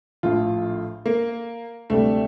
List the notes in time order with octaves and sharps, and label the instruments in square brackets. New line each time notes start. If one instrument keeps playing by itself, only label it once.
[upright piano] A#1 A2 F3 F4
A#3
D2 C3 G3 A3